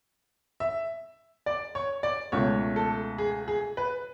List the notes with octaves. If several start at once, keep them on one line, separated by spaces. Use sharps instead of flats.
E5
D5
C#5
D5
C#2 B2 A3 C#5
A4
G#4
G#4
B4